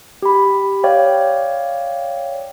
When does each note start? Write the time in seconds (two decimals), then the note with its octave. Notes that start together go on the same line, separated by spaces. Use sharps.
0.22 G4 B5
0.83 C#5 D5 F5 G5